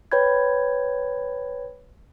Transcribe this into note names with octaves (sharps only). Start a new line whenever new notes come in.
B4 C#5 G5 B5 G6 G#6